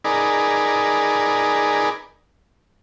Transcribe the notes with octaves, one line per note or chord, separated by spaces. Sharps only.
D#4 G#4 A#4 B4 D5